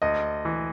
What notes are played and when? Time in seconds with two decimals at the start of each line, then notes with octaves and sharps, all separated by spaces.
0.02 D2 D#5
0.45 E3